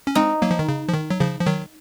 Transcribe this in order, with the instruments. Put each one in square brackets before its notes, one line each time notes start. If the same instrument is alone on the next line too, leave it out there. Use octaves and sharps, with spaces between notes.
[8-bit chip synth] C#4
[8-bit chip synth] G#3 C4 [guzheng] D#4
[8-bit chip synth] F#3 A#3
F3
D#3
C#3
F3
D#3
F#3
C#3 F3
F3
D#3 F#3